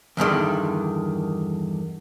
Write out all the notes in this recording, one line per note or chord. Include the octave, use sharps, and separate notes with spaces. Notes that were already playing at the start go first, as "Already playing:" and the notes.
E2 G2 D3 D#3